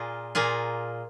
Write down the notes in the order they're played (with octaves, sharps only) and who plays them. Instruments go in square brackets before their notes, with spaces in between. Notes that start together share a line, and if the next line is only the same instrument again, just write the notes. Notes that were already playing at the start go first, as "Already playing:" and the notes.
Already playing: [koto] A#2 A#3 F4 G#4
A#2 A#3 F4 G#4